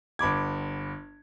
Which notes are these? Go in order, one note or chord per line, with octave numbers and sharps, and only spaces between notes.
G1 B5 D6 G#6